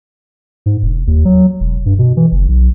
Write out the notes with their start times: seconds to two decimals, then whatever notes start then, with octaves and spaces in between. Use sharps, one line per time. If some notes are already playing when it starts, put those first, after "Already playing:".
0.66 G#2
0.83 E1
1.07 D#2
1.25 F#3
1.60 E1
1.86 G2
1.99 B2
2.17 E3
2.32 F#1
2.48 B1